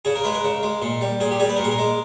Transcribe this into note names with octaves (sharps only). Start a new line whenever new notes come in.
C#3 G#4
A#4
G#3 B4
A#4
C#3
G#3
A#2
G3
A#2 G#4
G4
G3 G#4
B4
A#4
A#2 G#4
A#4
G#3